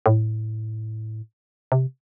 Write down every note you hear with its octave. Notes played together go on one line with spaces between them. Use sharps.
A2
C3